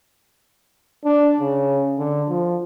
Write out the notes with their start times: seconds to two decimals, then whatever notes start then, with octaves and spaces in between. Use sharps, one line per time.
1.05 D4
1.40 C#3
1.98 D3
2.29 F3